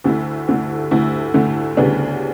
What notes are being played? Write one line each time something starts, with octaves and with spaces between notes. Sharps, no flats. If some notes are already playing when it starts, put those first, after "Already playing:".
D2 D3 A3 E4
D2 D3 A3 E4
D2 D3 A3 E4
D2 D3 A3 E4
D2 C#3 G3 B3 D4